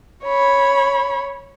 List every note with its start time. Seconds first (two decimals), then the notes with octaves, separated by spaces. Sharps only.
0.24 C#5 B5